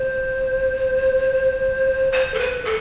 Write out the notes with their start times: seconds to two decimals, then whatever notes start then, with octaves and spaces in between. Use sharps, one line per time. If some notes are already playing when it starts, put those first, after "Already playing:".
Already playing: C5
2.12 C5
2.34 A4
2.39 B4
2.65 A4